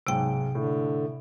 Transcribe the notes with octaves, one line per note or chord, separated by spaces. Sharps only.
B1 G#2 C3 G5 D7
A2 D3